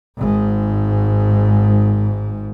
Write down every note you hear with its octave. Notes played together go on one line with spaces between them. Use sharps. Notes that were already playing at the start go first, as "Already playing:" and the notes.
G#1 G#2